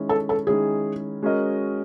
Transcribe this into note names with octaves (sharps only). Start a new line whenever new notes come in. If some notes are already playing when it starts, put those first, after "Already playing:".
Already playing: D#3 G#3 C#4 E4
A4
A4
D#3 G#3 C#4 E4 G#4
G#3 C#4 F#4 A#4 D#5